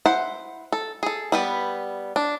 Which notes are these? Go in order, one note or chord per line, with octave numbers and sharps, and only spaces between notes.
E4 C5 F#5
A4
G#4 A4
G3 B3 B4
D4